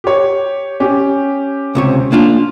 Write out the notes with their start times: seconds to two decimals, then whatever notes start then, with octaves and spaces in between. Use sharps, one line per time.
0.04 G4 C#5
0.80 C#4 G4
1.75 C#2 C3 C#5
2.12 A#3 D4 F4